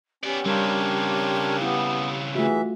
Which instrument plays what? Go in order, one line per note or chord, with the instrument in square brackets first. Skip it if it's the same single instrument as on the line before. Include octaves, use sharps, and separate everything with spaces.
[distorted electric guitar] B3 D5 [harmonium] C#4 [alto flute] G4
[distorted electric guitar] C#3 C4 [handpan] G3 [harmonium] D4 A#4 C#5
[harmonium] B3 [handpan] E4
[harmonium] E3 E5 [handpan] A3 F4 F#4 [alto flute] G#4